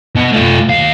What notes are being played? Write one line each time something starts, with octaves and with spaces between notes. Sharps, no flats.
B2 B3
A3 F4
D#2 F5